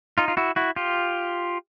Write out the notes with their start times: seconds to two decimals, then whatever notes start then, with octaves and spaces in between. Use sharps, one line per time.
0.18 D#4 F4
0.28 F4
0.37 E4 F#4
0.56 E4 F#4
0.76 F4 G4